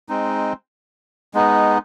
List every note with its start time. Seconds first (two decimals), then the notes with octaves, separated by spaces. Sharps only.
0.09 G#3 C4 D#4
1.34 G#3 B3 D#4